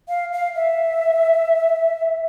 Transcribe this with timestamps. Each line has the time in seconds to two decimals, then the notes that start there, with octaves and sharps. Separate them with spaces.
0.09 F5
0.33 F5
0.55 E5